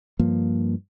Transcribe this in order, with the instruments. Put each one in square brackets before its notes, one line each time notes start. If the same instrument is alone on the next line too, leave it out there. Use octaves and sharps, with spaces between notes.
[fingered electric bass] G2 F3 A#3